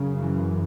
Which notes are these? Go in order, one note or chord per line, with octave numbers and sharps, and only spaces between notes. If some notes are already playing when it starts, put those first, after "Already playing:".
Already playing: F#2 C#3
E3